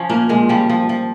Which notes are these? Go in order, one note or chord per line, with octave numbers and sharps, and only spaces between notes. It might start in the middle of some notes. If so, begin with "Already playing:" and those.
Already playing: F3 C#4
A#2 A#3
A#2 G#3
F3 G3
F3
F3